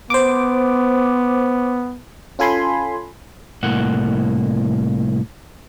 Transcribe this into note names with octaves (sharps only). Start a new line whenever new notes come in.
B3 C5 D6
C#4 F4 A4 G#5 B5 C6
C2 A2 A#3 F#5